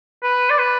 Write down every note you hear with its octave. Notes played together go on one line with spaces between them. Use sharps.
B4
D5
B4